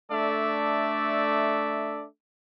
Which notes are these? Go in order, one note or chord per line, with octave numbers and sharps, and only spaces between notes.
A3 D4 A4 D5 E5